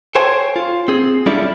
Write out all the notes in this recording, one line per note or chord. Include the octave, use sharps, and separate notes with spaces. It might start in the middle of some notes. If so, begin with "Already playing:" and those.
A4 C5 C#5 G5 G#5
F4
C4 G#4
G3 C#4 D4 E4 F4 A4